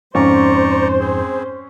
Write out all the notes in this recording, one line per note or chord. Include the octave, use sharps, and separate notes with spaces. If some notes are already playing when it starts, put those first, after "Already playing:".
F2 G#2 C#4 C5 D5 A#5 C#6
C4 G#4